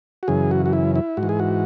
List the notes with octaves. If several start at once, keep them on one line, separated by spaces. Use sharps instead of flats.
F#4
F#2 C#3 E3 G#4
F#4
F#4
E4
E4
G#2 F#4
E3
G#4
F#4